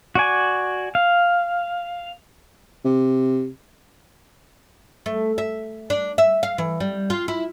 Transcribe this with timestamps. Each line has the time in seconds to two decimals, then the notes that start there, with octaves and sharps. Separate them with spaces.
0.15 F#4 D5 G#5
0.95 F5
2.85 C3
5.06 A3
5.38 E5
5.90 D4
6.18 E5
6.43 F5
6.58 E3
6.80 G3
7.10 F4
7.28 E4